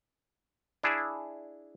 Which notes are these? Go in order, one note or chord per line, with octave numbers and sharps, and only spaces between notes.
D4 E4 G#4